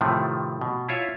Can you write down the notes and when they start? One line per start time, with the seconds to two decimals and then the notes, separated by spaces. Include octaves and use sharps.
0.01 A2 C3 D#3 F3 A3
0.61 B2
0.89 E4 F4 C#5 E5